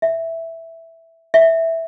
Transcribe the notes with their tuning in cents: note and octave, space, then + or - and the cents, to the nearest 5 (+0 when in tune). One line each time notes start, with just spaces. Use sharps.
E5 +0
E5 -5